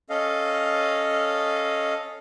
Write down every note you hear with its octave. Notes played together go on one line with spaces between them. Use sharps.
C#4 A4 D#5 F5